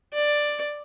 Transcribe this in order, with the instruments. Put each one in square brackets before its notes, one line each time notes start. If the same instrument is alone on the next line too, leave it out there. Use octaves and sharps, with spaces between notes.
[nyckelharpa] D5